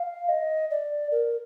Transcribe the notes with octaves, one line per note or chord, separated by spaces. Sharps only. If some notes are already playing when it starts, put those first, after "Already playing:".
Already playing: F5
D#5
D5
A#4